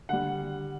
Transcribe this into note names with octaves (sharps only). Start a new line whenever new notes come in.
D3 G3 F#5